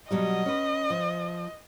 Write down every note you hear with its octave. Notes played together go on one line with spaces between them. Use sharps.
B2 F#3 G3 D#5
C#4 B4
F3